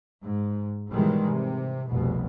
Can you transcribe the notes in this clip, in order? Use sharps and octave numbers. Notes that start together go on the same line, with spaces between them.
G#2
G#2 B2 D#3 E3 G3 G#3
C3
F1 C2 B2